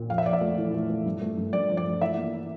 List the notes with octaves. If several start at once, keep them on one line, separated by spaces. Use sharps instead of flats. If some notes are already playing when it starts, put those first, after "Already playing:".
Already playing: A#2
F2 F5
E5
F2 D5
E5
A3
E3
A3
A3
G2
A3
G2
G2 D5
F3
D5
A3
E3 E5
A#3
E3